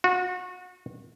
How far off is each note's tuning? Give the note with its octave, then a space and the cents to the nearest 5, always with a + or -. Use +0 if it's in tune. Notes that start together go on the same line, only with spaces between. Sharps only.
F#4 -30